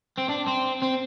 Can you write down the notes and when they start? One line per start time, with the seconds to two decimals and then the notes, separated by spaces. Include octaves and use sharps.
0.18 C4
0.29 D4
0.47 C4
0.82 C4